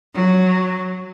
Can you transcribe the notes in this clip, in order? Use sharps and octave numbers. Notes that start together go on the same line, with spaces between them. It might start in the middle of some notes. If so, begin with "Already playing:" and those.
F#3